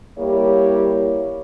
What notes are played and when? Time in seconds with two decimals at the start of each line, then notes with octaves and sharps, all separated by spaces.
0.18 G3 A#3 E4 G4 C#5